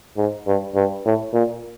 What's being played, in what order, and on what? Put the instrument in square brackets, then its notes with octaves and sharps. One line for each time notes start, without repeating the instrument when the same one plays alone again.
[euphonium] G#2
G2
G2
A2
A#2